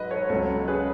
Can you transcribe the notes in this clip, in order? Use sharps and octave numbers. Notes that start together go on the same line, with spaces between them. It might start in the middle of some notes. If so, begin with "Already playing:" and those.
Already playing: G#2 F#3 B4 D#5
A4 C#5
C#2 C#3 F#3 A4 C#5
G#4 B4